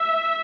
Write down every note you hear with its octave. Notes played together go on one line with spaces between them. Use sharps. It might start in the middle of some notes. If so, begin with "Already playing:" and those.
Already playing: E5